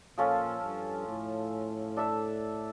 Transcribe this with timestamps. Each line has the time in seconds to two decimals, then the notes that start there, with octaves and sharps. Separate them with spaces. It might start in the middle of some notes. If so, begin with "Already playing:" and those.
0.17 A#2 F3 C#4 F4 A4
0.63 G2
1.07 A2
1.97 D4 A4 E5